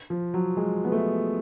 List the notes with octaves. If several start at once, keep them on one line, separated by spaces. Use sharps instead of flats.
F3
F#3
G#3
B3
A3